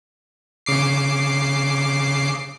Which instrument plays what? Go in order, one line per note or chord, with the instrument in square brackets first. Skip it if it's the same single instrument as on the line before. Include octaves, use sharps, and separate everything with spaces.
[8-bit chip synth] C#3 D6 C7